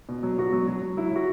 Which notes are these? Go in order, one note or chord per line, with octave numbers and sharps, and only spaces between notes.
B2
F#3
B2 F#4
F#3
F#3
F#3
F#3 E4
F#3 F#4